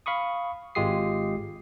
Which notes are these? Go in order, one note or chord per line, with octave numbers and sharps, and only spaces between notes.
F5 B5 C#6 D#6
G#1 G#3 F4 G4 D#6 C7